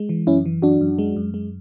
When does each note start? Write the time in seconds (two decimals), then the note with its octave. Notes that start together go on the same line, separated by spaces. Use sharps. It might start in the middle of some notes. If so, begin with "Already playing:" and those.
Already playing: G#3
0.09 E3
0.27 F#2 C#4 E4
0.45 E3
0.62 F#2 D4 F#4
0.81 F#2
0.98 G#3
1.16 F#2
1.34 G#3